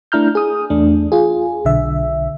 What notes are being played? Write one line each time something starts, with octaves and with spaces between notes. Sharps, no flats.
A3 D4 E4 A#5 F6 G6
G#4 D#6
E2 A3 D4
F4 G#4
B1 D3 E5